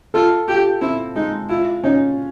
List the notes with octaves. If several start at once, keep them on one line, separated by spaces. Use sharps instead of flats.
F4 A4
F4 G4
C4 E4
G#3 D#4
E4 F4
C#4 D#4